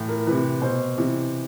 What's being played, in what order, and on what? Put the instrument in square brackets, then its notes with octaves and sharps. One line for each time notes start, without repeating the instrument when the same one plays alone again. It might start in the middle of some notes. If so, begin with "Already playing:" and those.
Already playing: [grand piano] A2 E3
A#4
C3 E3 B4
B2 C5
C3 E3